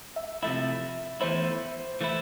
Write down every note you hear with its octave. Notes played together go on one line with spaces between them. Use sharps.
E5
C3 F3 A3 E4 E5
E2 E3 A3 E4 C5
E3 A3 E4